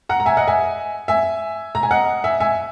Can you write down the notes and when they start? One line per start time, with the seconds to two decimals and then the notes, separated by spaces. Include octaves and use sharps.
0.09 F#5 A#5
0.20 A#5
0.26 E5 G#5
0.37 D#5 F#5
0.47 E5 G#5
1.08 E5 G#5
1.75 A#5
1.83 G#5
1.91 D#5 F#5
2.24 E5 G#5
2.40 E5 G#5